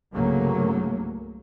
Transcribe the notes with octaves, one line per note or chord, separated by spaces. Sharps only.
C2 G2 C#3 F#3 A3 A#3